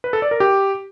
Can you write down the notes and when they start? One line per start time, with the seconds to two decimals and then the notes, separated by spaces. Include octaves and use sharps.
0.04 B4
0.13 A4
0.22 D5
0.31 A#4
0.40 G4